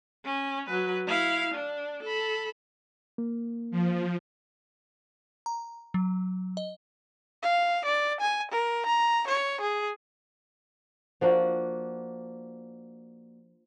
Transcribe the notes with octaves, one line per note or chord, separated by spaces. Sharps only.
C#4
F#3 B4
E4 F5
D4
A4 B5
A#3
F3
A#5
F#3
D#5
F5
D5
G#5
A#4
A#5
C#5
G#4
F3 A#3 D4 F#4